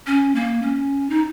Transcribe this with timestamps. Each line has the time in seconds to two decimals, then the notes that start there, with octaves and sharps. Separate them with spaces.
0.07 C#4
0.35 A#3
0.62 C#4
1.10 D#4